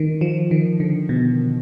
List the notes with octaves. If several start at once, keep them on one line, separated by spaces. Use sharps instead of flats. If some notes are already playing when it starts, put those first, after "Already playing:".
Already playing: D#3
F3
D#3
D3
B2